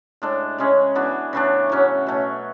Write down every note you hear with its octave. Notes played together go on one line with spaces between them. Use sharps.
A2 G#3 D4 A4
C#3 G#3 C#4 G#4
E3 B3 D4 F#4
C#3 E3 A3 D4
A2 F#3 C#4
B2 A3 C#4